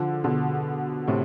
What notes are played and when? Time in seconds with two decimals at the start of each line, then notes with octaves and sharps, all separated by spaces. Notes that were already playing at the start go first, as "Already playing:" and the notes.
Already playing: D3 F3
0.24 B2 D3
1.07 A2 C3